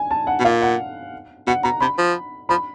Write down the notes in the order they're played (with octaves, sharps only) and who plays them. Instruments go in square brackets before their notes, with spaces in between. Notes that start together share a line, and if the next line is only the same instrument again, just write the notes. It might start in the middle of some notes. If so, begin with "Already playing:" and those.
Already playing: [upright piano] G#5
A5
F#5
[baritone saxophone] B2
[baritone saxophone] A#2 [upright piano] F5
[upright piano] F#5
[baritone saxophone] B2 [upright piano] F#5
[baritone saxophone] B2 [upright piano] A#5
[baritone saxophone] C3 [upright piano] B5
[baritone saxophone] F3
[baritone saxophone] F3 [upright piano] B5